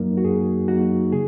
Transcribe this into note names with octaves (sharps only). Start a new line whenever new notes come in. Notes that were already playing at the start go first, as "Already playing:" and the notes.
Already playing: F#2 F#3 A#3 D#4 A#4
F#4
F#2 G#4
F#3 A#3 D#4 F#4
C#3 G#4